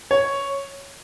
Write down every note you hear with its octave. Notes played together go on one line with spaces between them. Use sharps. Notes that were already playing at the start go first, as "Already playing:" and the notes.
C#5